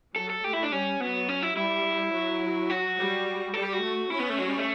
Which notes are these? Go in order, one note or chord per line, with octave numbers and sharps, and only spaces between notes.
F#3 A4
A4
A3 G4
E4
D4
G3 C#4
F#3 B3
C#4
E4
G3 E4
F#3
F#4
G3
G3 A4
G4
F#4
A3
C#4 E4
B3
A3
F#3
G3
A3